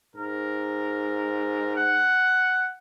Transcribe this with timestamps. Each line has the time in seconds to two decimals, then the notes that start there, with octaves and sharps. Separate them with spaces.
0.16 G#2 A#4
1.76 F#5